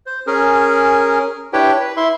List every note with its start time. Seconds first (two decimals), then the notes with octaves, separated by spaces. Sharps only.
0.06 C5
0.27 C#4 G#4 A#4
1.53 D4 E4 G4 B4 C#5 G5
1.80 B4
1.97 E4 E5 C6